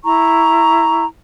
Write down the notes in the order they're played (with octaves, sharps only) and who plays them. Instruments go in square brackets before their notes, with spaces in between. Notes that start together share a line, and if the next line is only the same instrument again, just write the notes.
[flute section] E4 A#5 C#6